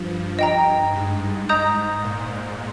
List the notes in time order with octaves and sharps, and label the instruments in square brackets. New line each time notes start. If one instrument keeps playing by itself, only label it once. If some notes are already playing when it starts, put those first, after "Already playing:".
Already playing: [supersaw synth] G2 F3
[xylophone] D#5 G5 A#5
[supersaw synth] G#2
[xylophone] D#5 A#5 D#6 G6
[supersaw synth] A#2